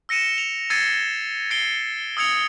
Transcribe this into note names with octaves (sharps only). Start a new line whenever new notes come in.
E6 A#6 C#7 D#7 E7
F7
E6 G#6 A6 C7 C#7 D#7
G#6 C7 D7 G7
D#6 E6 G#6 C#7 F7